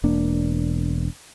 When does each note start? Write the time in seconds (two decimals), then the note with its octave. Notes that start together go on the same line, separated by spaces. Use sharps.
0.04 E1 A#3 D4